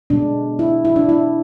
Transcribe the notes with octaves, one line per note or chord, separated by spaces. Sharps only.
B2 G#3 D4
E4
E4
D4
E4